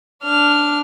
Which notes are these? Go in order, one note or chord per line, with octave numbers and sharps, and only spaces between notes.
D4 F6